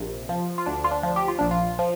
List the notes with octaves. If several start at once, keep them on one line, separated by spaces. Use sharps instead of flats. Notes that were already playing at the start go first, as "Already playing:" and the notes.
Already playing: A#1 C3
F3
F4
D2 D4
F4
D4
F3
G4
F4
A#1 D4
F4
F3